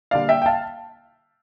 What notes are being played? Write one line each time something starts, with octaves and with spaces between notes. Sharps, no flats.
D3 G3 A#3 D5 F5
E5 G5
G5
F5 A5